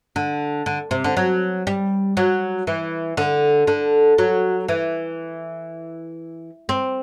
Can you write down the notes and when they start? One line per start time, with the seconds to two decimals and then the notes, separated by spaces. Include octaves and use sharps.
0.16 D3
0.66 D3
0.91 C3
1.04 D3
1.17 F#3
1.67 G3
2.17 F#3
2.67 E3
3.17 D3
3.67 D3
4.18 F#3
4.68 E3
6.69 C4